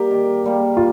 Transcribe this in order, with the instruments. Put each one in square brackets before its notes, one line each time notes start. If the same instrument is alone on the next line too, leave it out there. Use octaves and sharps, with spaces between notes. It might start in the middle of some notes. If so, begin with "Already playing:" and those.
Already playing: [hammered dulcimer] G3 A#3 [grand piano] G4
[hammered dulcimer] D#3
G3 A#3
[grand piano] F4